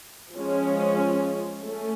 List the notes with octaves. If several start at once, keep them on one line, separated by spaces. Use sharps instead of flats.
F3 G#3 C#4
A3 C#4